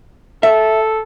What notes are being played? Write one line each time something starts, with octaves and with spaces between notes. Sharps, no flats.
A4 E5